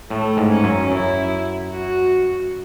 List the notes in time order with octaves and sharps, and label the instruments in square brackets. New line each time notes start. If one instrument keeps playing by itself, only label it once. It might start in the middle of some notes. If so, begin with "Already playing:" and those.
[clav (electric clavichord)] A2 [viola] A3
[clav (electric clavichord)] G#2
[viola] C#4
[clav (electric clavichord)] F#2
[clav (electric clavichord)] F#2 [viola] E4
[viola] F#4